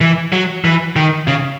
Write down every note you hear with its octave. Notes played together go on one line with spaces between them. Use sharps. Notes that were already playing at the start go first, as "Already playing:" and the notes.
E3
F#3
E3
D#3
C#3